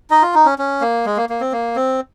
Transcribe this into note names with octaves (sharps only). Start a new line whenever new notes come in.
D#4 D#5
F4
D#4
C#4
C#4
A#3
G#3
A#3
A#3
C4
A#3
C4